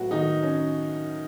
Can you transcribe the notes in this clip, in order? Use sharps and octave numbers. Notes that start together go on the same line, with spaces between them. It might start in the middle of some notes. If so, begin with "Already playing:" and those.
Already playing: A2 F#3 B3 F#4
D#3 D#4
C#4